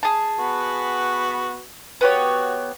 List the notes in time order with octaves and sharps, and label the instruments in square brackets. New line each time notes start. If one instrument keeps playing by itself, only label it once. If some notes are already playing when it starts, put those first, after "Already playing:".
[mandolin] G#4 A5
[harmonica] B3 F#4 B4
[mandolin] B3 G4 C#5 [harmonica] F#4